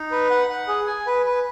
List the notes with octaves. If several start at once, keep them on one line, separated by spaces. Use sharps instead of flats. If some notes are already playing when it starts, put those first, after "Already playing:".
Already playing: D#4
B4
F#5
F#5
G#4
G#5
B4
B4